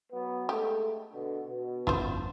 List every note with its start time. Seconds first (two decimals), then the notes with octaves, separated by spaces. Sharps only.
0.12 F#3 B3
0.49 G#3 A3 G4
1.13 B2 D3
1.48 B2
1.87 G1 F2 C#4 E4 F4 C5